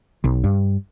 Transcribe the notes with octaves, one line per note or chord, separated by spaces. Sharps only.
B1
G2